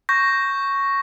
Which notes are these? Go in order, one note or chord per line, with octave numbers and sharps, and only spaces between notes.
C#6 G6 A#6